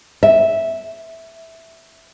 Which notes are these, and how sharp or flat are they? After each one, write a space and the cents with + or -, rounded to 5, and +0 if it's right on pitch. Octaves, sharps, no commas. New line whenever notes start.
E5 -5